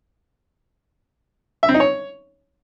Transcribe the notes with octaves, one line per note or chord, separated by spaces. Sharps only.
E5
C4
D#4
C#5